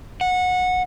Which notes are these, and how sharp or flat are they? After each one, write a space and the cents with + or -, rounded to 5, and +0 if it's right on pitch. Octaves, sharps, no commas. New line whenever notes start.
F#5 -20